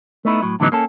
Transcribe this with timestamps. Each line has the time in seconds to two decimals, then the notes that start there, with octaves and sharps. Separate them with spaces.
0.25 A3 B3 D#4 E4
0.42 A2 F#3
0.60 A2 D3 E3 F#3 B3 D#4
0.72 A#3 C#4 A4